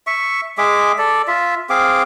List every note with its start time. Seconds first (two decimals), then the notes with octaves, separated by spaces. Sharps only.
0.07 E5 C#6
0.58 G#3 G#4 E5 D6
0.98 A4 D5
1.28 F4 E5
1.70 C4 G#4 F5 D6